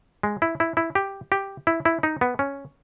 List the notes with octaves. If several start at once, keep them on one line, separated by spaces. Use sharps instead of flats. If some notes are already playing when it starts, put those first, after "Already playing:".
G#3
E4
E4
E4
G4
G4
E4
E4
D#4
B3
C#4